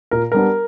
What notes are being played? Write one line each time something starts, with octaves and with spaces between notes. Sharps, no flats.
A#2 A#4
G3 B3 D4 A#4